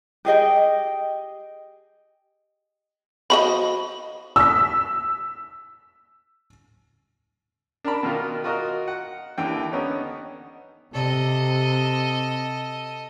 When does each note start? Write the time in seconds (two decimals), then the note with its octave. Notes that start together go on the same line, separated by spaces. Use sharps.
0.25 G4 G#4 D#5 G5
3.30 F3 F#4 D#5 B5
4.36 E6 B6
7.85 D4 A#4 A5 B5
8.03 B2 D#3 F4 A#4
8.44 F4 F#4 A#4 D#5
8.88 F#5
9.38 D#2 D3 E3 G5
9.72 D3 B3 C#4 D#4
10.93 C3 A4 D#5